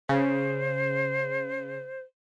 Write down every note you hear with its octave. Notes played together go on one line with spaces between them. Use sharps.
C#3 C5